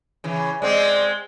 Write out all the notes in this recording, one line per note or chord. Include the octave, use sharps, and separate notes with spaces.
C#3 E3
G#3 C4 D5